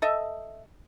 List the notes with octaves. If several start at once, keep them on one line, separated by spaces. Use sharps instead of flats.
A4 D#5 E5